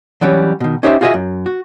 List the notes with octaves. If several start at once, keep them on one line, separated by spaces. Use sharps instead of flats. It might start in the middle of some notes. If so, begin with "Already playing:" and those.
E3 F#3 G3 C#4
B2 D#3
C#4 D#4 G4 C5 D#5 E5
F4 F#4 G#4 B4 D#5 E5
F#2
F#4